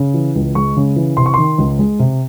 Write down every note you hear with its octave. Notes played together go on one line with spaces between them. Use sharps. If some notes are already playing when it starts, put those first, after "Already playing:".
Already playing: C#3
E3
C#2
G#3 C#6
C#3
E3
C3 C6
C#6
D#3 C6
C#2
G#3
C3